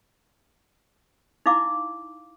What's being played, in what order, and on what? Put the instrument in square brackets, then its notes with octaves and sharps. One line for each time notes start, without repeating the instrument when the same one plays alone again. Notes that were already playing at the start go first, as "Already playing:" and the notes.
[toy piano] D#4 E4 F5 D6